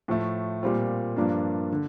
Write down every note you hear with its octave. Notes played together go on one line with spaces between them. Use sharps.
A2 F3 A3
A#2 G3 C4 F4
G2 F3 A#3 D4
D3